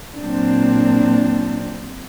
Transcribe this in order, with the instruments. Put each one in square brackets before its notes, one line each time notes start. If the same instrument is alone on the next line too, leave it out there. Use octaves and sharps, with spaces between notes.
[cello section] A#2 F#3 C4 D4